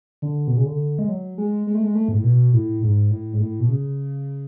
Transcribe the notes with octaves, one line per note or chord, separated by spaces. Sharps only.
D3
B2
C#3
D3
G#3
F#3
G#3
G#3
A3
G#3
A3
G#2
A2
B2
A2
G#2
A2
G#2
A2
B2
C#3